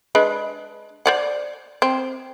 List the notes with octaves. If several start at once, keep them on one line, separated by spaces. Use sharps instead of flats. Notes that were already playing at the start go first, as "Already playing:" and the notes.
G#3 D4 B4
C5 D5 F#5
C4